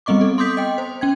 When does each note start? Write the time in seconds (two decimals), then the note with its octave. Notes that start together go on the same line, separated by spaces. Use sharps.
0.06 G3 B3 C4 D#5 C#6 D6
0.21 A4
0.38 C6 D6 D#6 G6 B6
0.57 D#5 G5
0.78 C5
1.01 C#4 G5 G#6